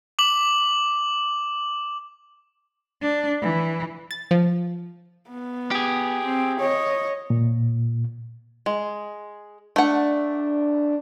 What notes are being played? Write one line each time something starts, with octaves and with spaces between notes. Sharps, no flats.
D6 F#7
D4
E3
A6
F3
B3
G4 G#4
C4
C#5 D#5
A#2
G#3
A3 D4 F#5